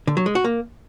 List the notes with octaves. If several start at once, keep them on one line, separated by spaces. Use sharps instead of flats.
D3
F#3
G#3
F#4
A#3